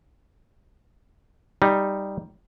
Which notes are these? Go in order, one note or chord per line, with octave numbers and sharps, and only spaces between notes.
G3 D#4